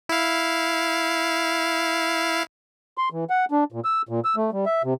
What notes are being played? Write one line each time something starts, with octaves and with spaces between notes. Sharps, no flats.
E4 F5
C6
E3
F#5
D4
A#2
E6
A#2
E6
A3
G3
E5
C3